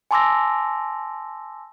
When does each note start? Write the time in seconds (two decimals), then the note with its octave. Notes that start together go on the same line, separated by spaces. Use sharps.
0.11 G#5 A5 C6 D6 E6 A#6